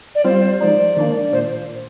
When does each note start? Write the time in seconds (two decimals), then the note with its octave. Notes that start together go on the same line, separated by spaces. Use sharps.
0.15 D5
0.24 G3 C4 F4 C5
0.61 F3 G#3 D#4 D5
0.97 D#3 A#3 D4
1.33 A#2 C5